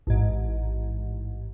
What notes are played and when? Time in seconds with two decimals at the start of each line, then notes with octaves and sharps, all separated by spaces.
0.07 A1 G#2